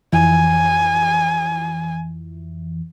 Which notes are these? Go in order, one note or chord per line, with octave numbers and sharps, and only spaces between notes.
F2 E3 G#5